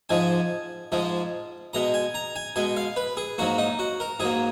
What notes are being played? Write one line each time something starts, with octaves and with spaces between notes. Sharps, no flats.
G#2 F3 G#3 G#5
G#2 F3 G#3
B2 G#3 A#5
G#5
A#5
G#5
B2 G#3 G#5
F5
B4
G#4
G#2 F#3 A#3 F#4
D#4
F#4
A#4
G#2 F#3 A#3 G#4